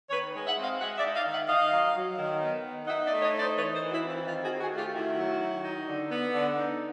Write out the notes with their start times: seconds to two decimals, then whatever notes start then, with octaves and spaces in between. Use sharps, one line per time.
0.10 D#3 B4 C#5
0.34 G#3
0.45 E5 F#5
0.57 C4
0.62 D#5 F5
0.79 G#3 E5 F#5
0.97 D5 E5
1.03 D#4
1.14 D#5 F5
1.25 D#3
1.31 E5 F#5
1.48 D#3 D#5 F5
1.71 F#3
1.95 F#3
2.18 D#3
2.41 B3
2.64 D#3
2.87 D#4 E5 F#5
3.04 D5 E5
3.10 A3
3.22 C#5 D#5
3.33 D#4
3.39 C5 D5
3.56 E3 B4 C#5
3.73 A#4 C5
3.79 E3
3.90 E4 F#4
4.02 C4
4.08 F4
4.25 D#3 F4
4.42 F#4 G#4
4.48 D#3
4.60 F#4 G#4
4.72 A3
4.77 F4 G4
4.94 D#3 E4 F#4
5.17 F#3
5.40 D#3
5.63 D#4
5.86 D3
6.10 B3
6.33 D3
6.56 D#4